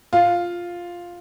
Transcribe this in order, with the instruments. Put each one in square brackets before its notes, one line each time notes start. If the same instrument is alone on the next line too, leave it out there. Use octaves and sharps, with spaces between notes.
[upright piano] F4